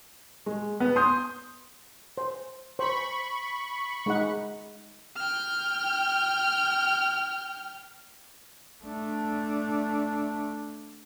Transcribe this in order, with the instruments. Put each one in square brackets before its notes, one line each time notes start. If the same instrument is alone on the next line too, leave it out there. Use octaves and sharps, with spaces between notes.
[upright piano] G#3
B3
C6 D#6 G6
[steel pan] C5
[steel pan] C5 [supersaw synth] B5 C#6
[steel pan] G#3 D#4 F#5
[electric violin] G5 F6
[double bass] A3 D4